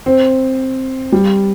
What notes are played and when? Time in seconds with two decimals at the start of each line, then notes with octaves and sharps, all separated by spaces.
0.06 C4
1.12 G3